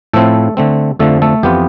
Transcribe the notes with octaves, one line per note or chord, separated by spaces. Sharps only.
A2 F3 A3 C4 E4 A4
D3 A3 C4
F2 D3 F3 A3 A4
A3 A4
F2 E3 B3 F4 G4